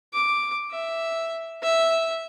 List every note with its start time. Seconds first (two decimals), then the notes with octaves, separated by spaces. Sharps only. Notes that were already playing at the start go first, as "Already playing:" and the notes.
0.14 D6
0.71 E5
1.63 E5